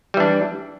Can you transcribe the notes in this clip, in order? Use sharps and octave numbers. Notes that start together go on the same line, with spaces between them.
E3 G3 D4